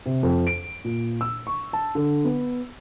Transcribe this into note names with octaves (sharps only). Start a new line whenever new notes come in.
C3
F2
D7
A#2
E6
C#6
A5
D3
B3